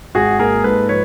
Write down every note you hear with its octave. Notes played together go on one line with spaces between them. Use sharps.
G#1 F#4 G#4
A#3 G#4 A#4
G#2 A4 B4
F3 B4 C#5